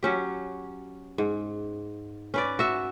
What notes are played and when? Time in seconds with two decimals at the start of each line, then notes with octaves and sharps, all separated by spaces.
0.03 F#3 C#4 G4
1.18 G#2
2.34 C#4 B4 D5
2.59 F#4 E5